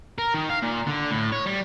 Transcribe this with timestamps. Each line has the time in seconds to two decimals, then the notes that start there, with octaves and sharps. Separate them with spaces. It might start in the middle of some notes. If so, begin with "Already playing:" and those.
0.18 A#4
0.34 D#3
0.49 F5
0.62 A#2
0.87 D3
1.11 A2
1.32 C#5
1.46 G3